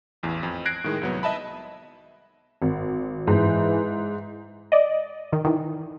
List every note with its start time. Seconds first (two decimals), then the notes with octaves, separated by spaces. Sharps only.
0.23 A1 E2
0.43 F2
0.66 F#6 G#6 A#6 C7 D7
0.84 A2 D#3 G#3
1.01 C2 F#3 B3
1.23 D#5 E5 A5 B5
2.62 G#1
3.27 G#2 E3
4.72 D5 D#5
5.33 D#3
5.45 D#3 E3